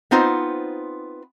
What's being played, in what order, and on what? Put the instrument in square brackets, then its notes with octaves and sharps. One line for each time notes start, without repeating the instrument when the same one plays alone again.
[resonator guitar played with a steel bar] B3 C4 D#4 F4 C5